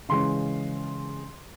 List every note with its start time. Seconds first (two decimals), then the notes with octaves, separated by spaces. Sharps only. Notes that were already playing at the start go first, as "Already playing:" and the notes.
0.09 C#3 E3 G#3 C#4 C6